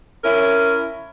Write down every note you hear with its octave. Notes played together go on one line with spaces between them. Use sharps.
C#4 E4 A#4